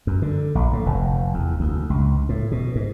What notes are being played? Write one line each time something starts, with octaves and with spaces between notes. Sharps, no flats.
F#2
D3
A#1
A2
F1
E2
D2
C#2
A2
B2
G#2